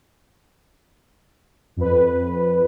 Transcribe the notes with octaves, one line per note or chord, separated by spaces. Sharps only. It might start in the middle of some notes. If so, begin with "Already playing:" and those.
F2 B4